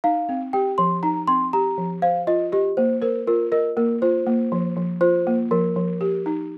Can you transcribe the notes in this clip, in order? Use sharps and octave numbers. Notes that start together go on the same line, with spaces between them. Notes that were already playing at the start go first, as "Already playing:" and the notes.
D#4 F5
C4
G4 G5
F3 C6
D#4 A#5
C4 C6
G4 A#5
F3
C5 F5
F4 D#5
G4 D#5
A#3 C5
A#4 C5
F4 A#4
A#4 D#5
A#3 A#4
F4 C5
A#3
F3
F3
F4 C5
A#3
F3 A#4
F3
G4
D#4